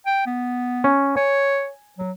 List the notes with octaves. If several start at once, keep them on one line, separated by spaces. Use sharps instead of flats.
G5
B3
C#4
C#5 G#5
F#3